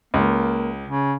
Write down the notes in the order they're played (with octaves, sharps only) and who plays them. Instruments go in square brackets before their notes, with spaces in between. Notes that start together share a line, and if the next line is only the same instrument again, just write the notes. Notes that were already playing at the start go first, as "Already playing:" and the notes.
[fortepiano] C#2 [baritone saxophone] A#3
[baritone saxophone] C#3